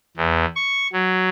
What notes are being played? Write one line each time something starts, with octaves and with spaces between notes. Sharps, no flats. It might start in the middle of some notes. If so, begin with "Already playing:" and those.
E2
C#6
F#3